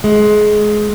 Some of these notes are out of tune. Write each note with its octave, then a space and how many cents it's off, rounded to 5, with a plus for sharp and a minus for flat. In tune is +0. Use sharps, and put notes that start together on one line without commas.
G#3 +20